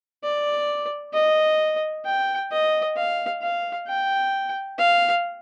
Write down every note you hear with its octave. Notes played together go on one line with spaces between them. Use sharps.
D5
D#5
G5
D#5
F5
F5
G5
F5